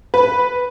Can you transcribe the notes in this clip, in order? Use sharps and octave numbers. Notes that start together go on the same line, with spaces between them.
B4